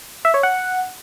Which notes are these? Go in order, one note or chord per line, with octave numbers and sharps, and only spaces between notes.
E5
C#5
F#5